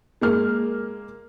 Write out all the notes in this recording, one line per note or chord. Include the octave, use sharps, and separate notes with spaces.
G#3 A#3 F6